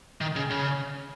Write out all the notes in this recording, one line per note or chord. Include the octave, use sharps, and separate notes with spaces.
D#3
C#3
C#3